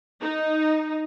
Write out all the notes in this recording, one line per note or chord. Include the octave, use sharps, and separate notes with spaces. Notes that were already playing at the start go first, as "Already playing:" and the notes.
D#4